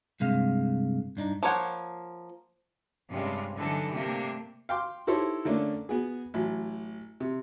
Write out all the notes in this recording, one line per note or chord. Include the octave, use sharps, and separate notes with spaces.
G2 C3 G#3 F5
G2 D4 D#4
F3 A#3 C#5 F#5 G5
G2 C3 G#3 C#4 D4 F4
D3 E3 F#3 D4 D#4 A4
C3 A3 A#3 D4 G4
F5 G5 C6 D6
D#4 E4 G4 A4 C5 C#5
D3 A3 A#3 C#4 D4
B3 F#4 G#4
A1 F#3
C3